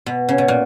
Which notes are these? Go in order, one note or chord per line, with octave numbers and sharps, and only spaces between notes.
B2
C#3
B2
A#2